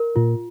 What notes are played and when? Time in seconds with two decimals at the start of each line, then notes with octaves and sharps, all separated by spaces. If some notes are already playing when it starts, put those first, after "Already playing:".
Already playing: A#4
0.16 A#2 F4